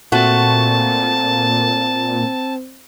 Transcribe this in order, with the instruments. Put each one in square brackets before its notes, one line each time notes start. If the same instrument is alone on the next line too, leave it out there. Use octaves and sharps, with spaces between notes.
[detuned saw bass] A#2 [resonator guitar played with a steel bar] A3 F#4 [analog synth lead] C4 [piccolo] A5